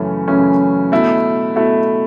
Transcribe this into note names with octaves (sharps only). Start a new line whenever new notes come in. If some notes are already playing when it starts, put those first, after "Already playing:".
Already playing: F#2 C#3 E3 A3 C#4
F#2 C#3 E3 A3 C#4
B2 A3 E4
B2 A3 E4